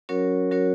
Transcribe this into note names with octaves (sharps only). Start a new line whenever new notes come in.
F#3 C#4 F#4 A#4 C#5
F#3 C#4 F#4 A#4 C#5